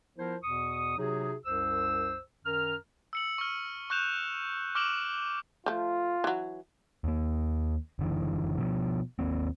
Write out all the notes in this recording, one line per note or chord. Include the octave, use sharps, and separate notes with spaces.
F3 B3 E4 F4 A#4 C5
E2 B2 C#6 D#6
C3 F#3 D#4 F#4 G#4
C2 F#2 C5 E6
F#2 D#3 A#4 A#5 F6
E6 C#7 F#7
C#6 F6
C#6 F#6 G6 E7 F7
C#6 D6 F6 D7 E7 F#7
F3 A3 F4
E3 F#3
D#2 A#3
F#1 D3 E3
B2 F3
D#2 A#3 C4